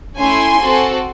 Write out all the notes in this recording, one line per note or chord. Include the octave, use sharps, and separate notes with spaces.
A3 C#4 E4 G#5 C6
C4 F#4 A4